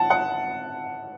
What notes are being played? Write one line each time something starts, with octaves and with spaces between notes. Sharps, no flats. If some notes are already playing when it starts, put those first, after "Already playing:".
Already playing: F#5 A5
F#5